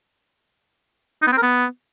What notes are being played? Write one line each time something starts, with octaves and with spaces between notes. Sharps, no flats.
D#4
B3
C4
A#4
B3